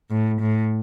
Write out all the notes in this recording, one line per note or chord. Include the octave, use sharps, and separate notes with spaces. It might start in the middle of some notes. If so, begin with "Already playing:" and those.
A2
A2